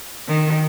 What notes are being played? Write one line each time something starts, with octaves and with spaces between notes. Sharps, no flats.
D#3